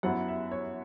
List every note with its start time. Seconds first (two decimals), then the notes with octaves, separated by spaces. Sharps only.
0.03 F#2 F#3 B3 E4 F#5
0.28 E5
0.51 C#5